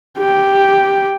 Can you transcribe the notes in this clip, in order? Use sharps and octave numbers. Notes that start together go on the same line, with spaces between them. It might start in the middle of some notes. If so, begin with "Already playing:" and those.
G4